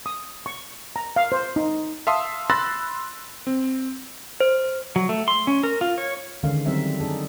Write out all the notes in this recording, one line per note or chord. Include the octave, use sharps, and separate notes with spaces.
D#6
C#6
A#5
F5
C5
D#4
E5 F5 A5 C6 D#6 E6
B5 C6 E6 F#6 A6 A#6
C4
C5
F#3
A3
C6
C#4
A#4
F4
C#5
D3 D#3 G#3 C#4 F5
D#3 F#3 G3 C4 D#4 E5
D4 D#4 G#4 A4